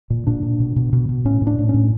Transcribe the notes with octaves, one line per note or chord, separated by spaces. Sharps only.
A#2
A#2 D4
A#2
B2
B2
B2
B2
A2 C#4
A2
D4
A2
C#4
A2